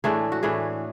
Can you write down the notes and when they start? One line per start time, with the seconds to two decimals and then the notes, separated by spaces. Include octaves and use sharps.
0.04 A2 E3 A3 D4 G#4
0.32 F#4
0.43 A2 E3 A3 D4 G#4